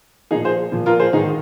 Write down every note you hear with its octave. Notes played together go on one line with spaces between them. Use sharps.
A#2 F3 D#4 G#4
G#4 C5
A#2 F3
F4 A#4
G#4 C5
G#2 D#3 D#4 G#4